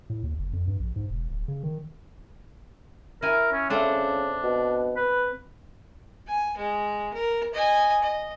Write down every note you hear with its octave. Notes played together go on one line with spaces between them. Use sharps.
A2
D#2
F#1
F2
G2
A#1
G#2
E1
D1
C#3
D#3
E4 A#4 G#5
C#4
C#3 A3 C4 D4
B2
B4
G#5
G#3
A#4
D#5 G#5
D#5